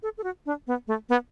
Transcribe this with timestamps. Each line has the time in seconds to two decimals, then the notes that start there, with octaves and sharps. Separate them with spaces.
0.03 A4
0.18 A4
0.24 F#4
0.46 D4
0.67 B3
0.87 A3
1.09 B3